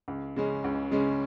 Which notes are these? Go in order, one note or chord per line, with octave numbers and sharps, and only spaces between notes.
C#2
C#3 G#3 C#4
C#2
C#3 G#3 C#4